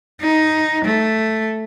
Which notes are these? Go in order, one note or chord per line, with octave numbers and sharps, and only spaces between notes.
D#4
A3